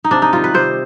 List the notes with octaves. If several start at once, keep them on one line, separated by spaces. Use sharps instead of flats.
D#4
C3 D4
D#4
D#3 G3 F4
B4
C3 C5